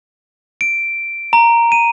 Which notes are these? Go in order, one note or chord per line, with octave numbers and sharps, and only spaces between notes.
D7
A#5
D#7